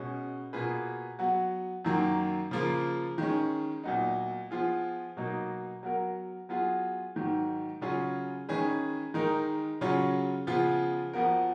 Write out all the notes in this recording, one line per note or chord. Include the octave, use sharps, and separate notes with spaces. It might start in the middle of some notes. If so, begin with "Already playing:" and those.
Already playing: B2 G#3 C#4
B2 A#3 F4 G#4 B4
F#3 B3 F#4
F#2 D#3 F#3 A#3
C#3 F3 A#3 F4
D#3 G#3 C#4
A#2 F#3 B3 D#4
F3 B3 F4 G#4
B2 F#3 A#3 D#4
F#3 B3 F#4 A#4
F#3 B3 F4 G#4
G#2 D#3 F#3
C#3 F#3 C#4 F4 G#4
D#3 G#3 C#4 G#4 B4
D#3 G#3 D#4 A#4
C#3 F#3 C#4 F4
C#3 F3 B3 F4 G#4
F2 F3 B3 F#4 A#4